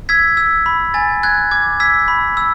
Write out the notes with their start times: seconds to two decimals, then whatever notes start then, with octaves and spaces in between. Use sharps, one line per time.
0.09 E6 G#6 B6
0.37 E6
0.66 B5
0.94 G#5 A6
1.23 F#6 G#6
1.51 D6 G#6
1.80 E6 G#6 B6
2.08 B5
2.37 E6